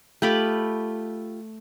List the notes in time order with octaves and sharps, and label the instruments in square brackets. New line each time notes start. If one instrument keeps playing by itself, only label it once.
[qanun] A3 B5 D6 [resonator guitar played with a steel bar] F4 G4